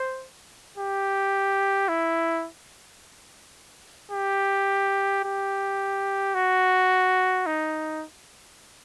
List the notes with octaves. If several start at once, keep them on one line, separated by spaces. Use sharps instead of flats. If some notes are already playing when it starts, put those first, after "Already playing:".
Already playing: C5
G4
E4
G4
G4
F#4
D#4